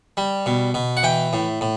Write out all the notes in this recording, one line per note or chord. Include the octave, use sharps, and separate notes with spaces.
G3
B2
B2
F#5
E3 G5
A2
A2